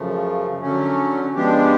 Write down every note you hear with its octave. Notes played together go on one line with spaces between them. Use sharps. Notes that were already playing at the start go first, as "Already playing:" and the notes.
Already playing: F#2 C#3 F3 A3
D3 F#3 A3 C#4
F3 G#3 B3 D4 G4